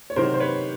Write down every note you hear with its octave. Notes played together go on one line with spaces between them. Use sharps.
C#5
C3 D#3 F#3 A#4 C5
C5
B4 C#5